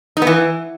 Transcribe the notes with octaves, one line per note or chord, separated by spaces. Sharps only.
D#4
B3
E3